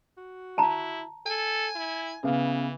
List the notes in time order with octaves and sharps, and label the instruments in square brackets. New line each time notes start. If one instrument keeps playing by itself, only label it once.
[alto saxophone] F#4
[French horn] E4 [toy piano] A5 A#5
[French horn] A4 [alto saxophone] G#5
[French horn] E4
[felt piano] C#3 B3 F5 [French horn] E3